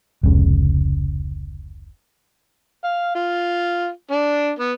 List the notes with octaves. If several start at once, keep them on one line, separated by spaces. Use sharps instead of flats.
F1 C#2 C#3
F5
F4
D4
B3